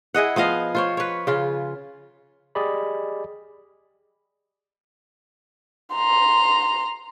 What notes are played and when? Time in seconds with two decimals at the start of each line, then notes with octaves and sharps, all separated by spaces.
0.14 E4 G#4 D#5 F#5
0.36 F3 B3 D#5 F5
0.75 F4 C5 C#5
0.97 B4 C#5
1.27 C#3 F4
2.55 G4 G#4 D5 D#5 B5
5.95 A#5 C6